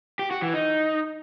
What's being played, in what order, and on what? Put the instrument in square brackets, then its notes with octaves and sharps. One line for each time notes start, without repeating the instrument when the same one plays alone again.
[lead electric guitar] G4
F#4
E3
D#4